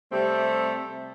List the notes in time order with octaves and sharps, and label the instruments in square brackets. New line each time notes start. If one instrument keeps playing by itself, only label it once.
[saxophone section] C3 G3 A3 C4